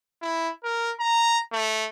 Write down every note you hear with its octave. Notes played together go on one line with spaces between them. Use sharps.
E4
A#4
A#5
A3